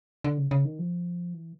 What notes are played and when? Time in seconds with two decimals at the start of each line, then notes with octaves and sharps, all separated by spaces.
0.24 D3
0.38 C#3
0.51 C#3
0.65 D#3
0.79 F3
1.34 E3